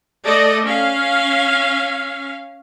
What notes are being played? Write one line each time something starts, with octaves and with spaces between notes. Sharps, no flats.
A3 A4 D5 D#5
C#4 F5